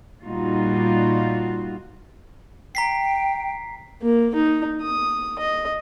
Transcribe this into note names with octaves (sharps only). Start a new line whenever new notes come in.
A#2 G3 D#4 F4 F#4
G5 A#5 B6 C7
A#3
D#4
D#6
D#5